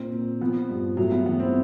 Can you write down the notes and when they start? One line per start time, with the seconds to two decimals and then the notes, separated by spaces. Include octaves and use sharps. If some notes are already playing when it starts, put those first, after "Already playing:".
Already playing: A#2 C4
0.12 A#2
0.41 F3 B3
0.69 G2
0.97 A2 F#3
1.12 B3
1.26 E3 B3
1.40 C4